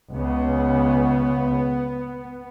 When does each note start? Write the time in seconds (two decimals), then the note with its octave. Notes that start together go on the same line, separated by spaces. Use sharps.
0.13 C#2 C#3 B3